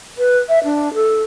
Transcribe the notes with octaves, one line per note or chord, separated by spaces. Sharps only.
B4
E5
D4
A4